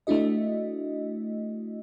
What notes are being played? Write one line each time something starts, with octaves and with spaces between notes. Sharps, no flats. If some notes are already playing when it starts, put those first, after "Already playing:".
A3 D4 E4 F#4 D#5